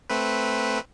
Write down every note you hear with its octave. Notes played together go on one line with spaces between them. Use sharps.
A3 C4 B4